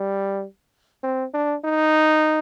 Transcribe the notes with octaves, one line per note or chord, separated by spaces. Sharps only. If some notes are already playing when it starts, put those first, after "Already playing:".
Already playing: G3
C4
D4
D#4